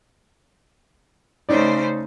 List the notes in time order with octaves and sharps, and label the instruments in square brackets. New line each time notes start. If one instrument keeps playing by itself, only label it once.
[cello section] C#3 A3 C5 [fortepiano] C#4 D#4 D5